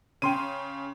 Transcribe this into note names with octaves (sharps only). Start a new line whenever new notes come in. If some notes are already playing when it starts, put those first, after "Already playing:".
C#3 G5 C6 D#7